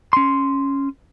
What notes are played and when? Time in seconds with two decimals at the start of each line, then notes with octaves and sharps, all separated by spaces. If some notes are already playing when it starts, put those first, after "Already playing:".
0.13 C#4 C6